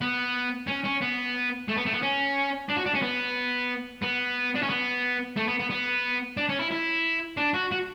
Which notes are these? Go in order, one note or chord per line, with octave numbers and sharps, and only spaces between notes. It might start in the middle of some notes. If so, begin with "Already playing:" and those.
B3
C#4
C#4
B3
A3
B3
A3
B3
C#4
D4
F#4
D4
C#4
B3
B3
D4
C#4
B3
A3
B3
B3
B3
D4
C#4
E4
E4
D4
F#4
F#4